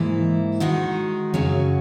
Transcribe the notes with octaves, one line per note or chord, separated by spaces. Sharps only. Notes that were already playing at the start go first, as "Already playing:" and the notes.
Already playing: G#2 E3 A#3 E4
D#3 G#3 D#4 F#4
F#2 C#3 F#3 C#4 F#4